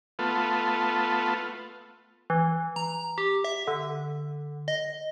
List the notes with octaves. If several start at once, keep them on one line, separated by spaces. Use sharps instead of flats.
A3 B3 F4
E3
A#5
G4
E5
D3
D#5